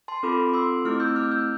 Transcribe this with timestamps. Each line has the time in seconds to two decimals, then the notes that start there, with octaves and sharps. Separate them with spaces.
0.08 A5 C6
0.23 C4 F4 A4 B5 D6
0.49 D6
0.54 C6 E6
0.85 A3 C4 E4 G4 D6 F6
1.00 E6 G6
1.15 D6 F6
1.31 E6 G6